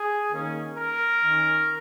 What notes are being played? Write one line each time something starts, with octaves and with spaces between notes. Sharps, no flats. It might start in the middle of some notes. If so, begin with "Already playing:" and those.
Already playing: G#4
D#3 A#3 C#4
A#4
D#3 C#4